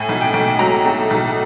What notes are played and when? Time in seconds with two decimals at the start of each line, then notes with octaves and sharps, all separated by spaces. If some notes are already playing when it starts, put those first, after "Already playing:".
Already playing: A2 G#5
0.09 B1
0.21 G5
0.34 B1
0.59 F#3 A#5
0.85 A2
1.10 B1